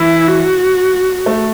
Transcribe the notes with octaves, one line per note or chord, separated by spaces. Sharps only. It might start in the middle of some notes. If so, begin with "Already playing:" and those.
Already playing: E3 E4
F#4
A3